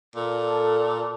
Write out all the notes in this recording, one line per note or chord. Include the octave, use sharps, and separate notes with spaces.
A#2 A4